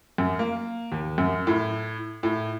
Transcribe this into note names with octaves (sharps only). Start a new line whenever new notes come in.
F#2
A#3
D#2
F#2
A2
A2